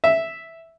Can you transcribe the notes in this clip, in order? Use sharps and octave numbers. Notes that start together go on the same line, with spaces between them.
E5